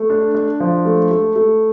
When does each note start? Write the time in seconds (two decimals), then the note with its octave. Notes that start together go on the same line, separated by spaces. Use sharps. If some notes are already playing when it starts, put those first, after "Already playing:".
Already playing: A3
0.10 D4
0.35 D4
0.60 F3
0.85 A3
1.11 A3
1.36 A3